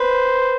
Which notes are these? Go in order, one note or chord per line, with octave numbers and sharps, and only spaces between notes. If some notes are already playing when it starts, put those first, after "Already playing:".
Already playing: B4 C5